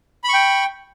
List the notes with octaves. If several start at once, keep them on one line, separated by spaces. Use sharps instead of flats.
G5 B5 C#6